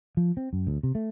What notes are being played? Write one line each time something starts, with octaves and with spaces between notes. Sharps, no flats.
F3
C4
F#2
D2
C3
A3